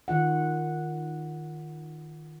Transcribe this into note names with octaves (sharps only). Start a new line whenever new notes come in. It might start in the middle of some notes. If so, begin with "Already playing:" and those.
D#3 F4 F#5